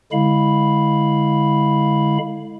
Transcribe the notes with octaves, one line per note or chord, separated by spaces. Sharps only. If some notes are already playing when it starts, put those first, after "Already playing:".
D3 G#3 E4 F5 B5